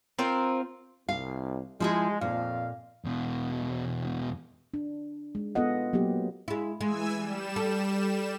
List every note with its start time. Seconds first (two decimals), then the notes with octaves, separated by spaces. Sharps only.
0.19 C4 F4 A#4
1.09 C2 F5
1.80 F3 G#3 E4 G#4
2.21 F2 A#2 F5
3.05 E2 B2
4.74 D4
5.35 G#3
5.55 B3 F4 A4 D#5 F#5
5.93 F#3 A#3 B3 G4
6.48 G#3 E4
6.81 E3 G#3 G#5 E6
7.15 G3 E7
7.56 A4